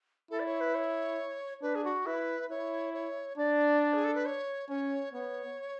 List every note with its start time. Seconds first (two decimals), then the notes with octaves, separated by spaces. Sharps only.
0.31 E4 A4
0.40 D5
0.46 C#5
0.61 B4
0.75 C#5
1.62 D4 B4
1.75 G#4
1.84 F#4
2.06 E4 B4
2.50 E4 C#5
2.94 C#5
3.38 D4 D5
3.93 G#4
4.04 A4
4.15 B4
4.26 C#5
4.69 C#4 C#5
5.13 B3 C#5